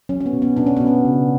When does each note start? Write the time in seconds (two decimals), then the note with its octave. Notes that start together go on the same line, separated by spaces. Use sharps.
0.09 F#3 C#4
0.21 C#4
0.26 B3
0.33 B2
0.42 B3
0.57 B2 D4
0.67 C#4
0.77 B2 B3
0.87 C#4
1.05 C#3